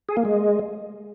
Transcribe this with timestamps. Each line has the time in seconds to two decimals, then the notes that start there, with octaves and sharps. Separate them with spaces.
0.09 G#4
0.17 A#3
0.25 G#3